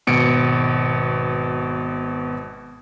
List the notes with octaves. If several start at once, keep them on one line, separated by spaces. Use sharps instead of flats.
G#1 B2 C#7 D7